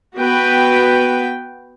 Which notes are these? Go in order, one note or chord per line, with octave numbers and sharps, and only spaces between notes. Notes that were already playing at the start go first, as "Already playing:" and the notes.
B3 F#4 B4 G5